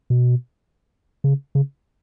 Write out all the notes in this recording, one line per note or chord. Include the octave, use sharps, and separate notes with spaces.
B2
C#3
C#3